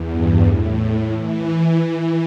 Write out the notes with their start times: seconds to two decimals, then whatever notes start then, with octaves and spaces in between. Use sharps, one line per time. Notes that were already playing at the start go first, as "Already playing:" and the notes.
Already playing: E2
0.09 G2
0.43 A2
1.11 E3
1.80 E3